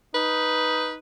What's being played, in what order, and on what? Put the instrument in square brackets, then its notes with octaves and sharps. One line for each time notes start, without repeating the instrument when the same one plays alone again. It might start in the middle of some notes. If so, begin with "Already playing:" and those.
[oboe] D#4 [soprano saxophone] B4